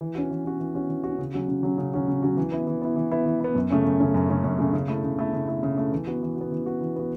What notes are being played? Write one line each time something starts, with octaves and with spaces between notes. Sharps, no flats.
E3
C#4 F#4
E3
C#4 F#4
E3
C#4 F#4
E3
F#4
C#4
C#3
F#3 C#4 F#4
C#3
F#3 C#4 F#4
C#3
F#3 C#4 F#4
C#3
F#3 C#4 F#4
E3
B3 E4
E3
B3 E4
E3
B3 E4
E3
B3 E4
F#2
C#3 A3 C#4
F#2
C#3 A3 C#4
F#2
C#3 A3 C#4
F#2
C#3 A3 C#4
C#3
A3 E4
C#3
A3 E4
C#3
A3 E4
C#3
A3 E4
E3
B3 F#4
E3
B3 F#4
E3
B3 F#4
E3
B3 F#4